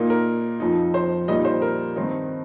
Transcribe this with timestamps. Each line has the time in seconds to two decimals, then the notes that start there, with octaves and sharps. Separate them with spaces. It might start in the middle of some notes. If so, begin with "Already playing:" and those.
Already playing: A#2 A#3 D#4
0.10 A#4
0.60 F2 F3 D#4
0.94 C5
1.28 A#2 G3 D#4 D#5
1.45 C5
1.62 A#4
1.96 G2 D#3 C4 D#4